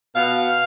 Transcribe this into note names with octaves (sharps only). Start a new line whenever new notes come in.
B2 F5